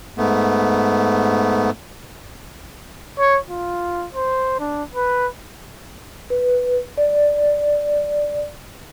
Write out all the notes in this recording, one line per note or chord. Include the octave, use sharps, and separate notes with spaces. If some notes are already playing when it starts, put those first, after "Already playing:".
G#2 A3 B3
C#5
F4
C5
D4
B4
B4
D5